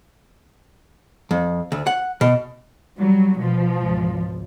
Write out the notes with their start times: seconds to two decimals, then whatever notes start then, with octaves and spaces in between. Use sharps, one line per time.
1.31 F2
1.72 D2
1.87 F#5
2.21 B2
2.99 F#3 G3
3.39 B2 F3
3.76 G#1 C#2